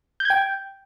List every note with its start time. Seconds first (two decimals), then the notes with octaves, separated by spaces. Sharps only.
0.20 G6
0.25 G#6
0.30 G5